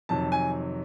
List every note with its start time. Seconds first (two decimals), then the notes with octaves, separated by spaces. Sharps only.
0.09 F2 C3 D#3 F#3 A5
0.32 G#5